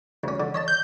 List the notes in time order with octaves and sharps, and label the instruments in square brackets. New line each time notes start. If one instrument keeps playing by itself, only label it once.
[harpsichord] D2 C#4
D3
C#5 D#5 A5
[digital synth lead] G6